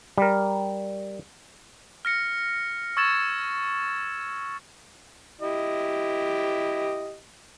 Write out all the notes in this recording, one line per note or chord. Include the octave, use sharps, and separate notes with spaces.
G3 A#4
F6 A#6 C#7
C#6 E6 G#6 A6 E7
E4 G4 D#5